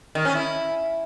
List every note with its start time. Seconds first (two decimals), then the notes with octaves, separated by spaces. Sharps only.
0.15 D#3
0.25 C#4
0.35 E4